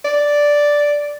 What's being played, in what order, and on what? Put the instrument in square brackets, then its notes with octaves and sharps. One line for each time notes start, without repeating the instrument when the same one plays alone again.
[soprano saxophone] D5